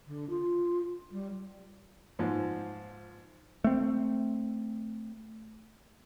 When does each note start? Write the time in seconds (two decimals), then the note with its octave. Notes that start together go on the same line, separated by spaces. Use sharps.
0.07 D3
0.29 F4
1.11 G3
2.19 G#2 F3
3.64 A3 C4